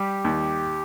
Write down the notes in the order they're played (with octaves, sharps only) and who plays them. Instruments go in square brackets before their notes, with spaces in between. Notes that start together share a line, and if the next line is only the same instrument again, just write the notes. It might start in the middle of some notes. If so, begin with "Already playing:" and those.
Already playing: [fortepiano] G3 [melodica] G4
[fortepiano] D#2